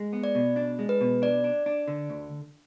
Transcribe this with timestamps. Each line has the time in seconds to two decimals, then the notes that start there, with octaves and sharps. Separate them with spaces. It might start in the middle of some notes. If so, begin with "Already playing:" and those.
Already playing: G#3
0.13 B3
0.24 D5
0.35 B2
0.56 D4
0.79 G#3
0.89 B4
1.01 B2
1.22 D4 D5
1.44 D4
1.66 D4
1.88 D3
2.10 D2